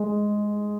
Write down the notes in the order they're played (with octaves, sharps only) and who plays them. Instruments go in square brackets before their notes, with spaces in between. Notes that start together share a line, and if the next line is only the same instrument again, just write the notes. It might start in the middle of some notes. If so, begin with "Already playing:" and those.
Already playing: [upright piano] G#3